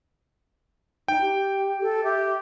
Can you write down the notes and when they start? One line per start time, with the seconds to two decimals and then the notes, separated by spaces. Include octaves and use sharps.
1.08 D#4 G5
1.21 G4
1.81 A4
2.04 G4 E5